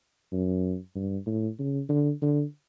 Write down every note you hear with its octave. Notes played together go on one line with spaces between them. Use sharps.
F#2
G2
A2
C#3
D3
D3